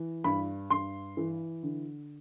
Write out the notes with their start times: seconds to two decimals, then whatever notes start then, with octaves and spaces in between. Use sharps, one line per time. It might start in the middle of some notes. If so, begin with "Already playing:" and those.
Already playing: E3
0.24 G2 B5
0.70 G2 C6
1.17 E3
1.63 D3